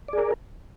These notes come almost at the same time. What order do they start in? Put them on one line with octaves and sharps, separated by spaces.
D5 G#4 A#4